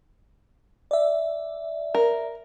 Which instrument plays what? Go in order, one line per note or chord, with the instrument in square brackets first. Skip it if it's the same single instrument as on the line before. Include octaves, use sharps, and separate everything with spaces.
[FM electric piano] D5 E5
[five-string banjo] A#4